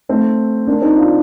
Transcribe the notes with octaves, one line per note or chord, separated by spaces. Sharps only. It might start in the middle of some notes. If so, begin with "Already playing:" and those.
A3 C4
A#3 D4
C4 D#4
D4 F4